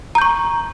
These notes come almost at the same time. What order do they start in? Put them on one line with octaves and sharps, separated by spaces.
A#5 G6 C#6